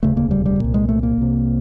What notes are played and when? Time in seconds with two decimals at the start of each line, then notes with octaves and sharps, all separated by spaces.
0.03 E1 D2 C#3 A3
0.17 A#3
0.31 G3
0.46 G3
0.60 C2 A#2
0.74 G#3
0.89 A3
1.03 A#3
1.17 C2 C3